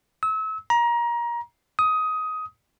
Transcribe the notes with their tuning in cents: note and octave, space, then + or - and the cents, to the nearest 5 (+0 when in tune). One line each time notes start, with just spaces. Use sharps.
E6 -35
A#5 +25
D#6 +15